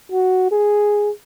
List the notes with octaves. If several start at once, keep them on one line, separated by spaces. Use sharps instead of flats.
F#4
G#4